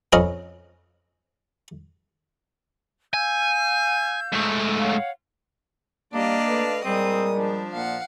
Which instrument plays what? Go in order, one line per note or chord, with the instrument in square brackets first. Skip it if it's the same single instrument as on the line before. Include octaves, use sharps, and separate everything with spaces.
[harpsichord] F2 C#4 A#4 D#5 B5
[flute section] F5 E6 G6 [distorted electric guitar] G#5
[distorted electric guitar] G#2 A3
[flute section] C#5 F5 F#5
[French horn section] G3 [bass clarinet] A#3 [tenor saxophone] D4 [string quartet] D5 D#5 F5
[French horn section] A3 A4 B4
[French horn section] A#2 G#3 A#4 [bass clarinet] G3 [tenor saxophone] C4 [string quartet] D#6
[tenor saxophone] F3 [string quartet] D4
[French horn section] A#2 [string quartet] F5 F#5